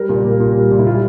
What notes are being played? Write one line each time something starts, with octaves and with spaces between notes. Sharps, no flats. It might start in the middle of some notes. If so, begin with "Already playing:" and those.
Already playing: G3 A#4
A#2
A#3
A#2
G3
A#2
E4
G3 F4